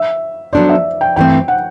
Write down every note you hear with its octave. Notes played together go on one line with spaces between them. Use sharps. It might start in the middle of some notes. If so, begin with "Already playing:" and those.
Already playing: E5
F#3 B3 D4 A4 C5 D5
E5
G5
G2 E3 A3 C4 G5
F#5